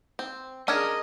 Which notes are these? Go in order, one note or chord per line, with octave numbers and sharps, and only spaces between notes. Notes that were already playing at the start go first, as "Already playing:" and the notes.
C4
C#4 D4 G#4 A#4 D#5 E6 F6 G#6